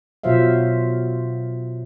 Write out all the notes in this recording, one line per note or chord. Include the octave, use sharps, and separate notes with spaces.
B2 F#3 F4 C5 E5 F5